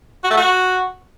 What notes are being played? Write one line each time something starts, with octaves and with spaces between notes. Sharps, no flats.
F#4
A3
F#4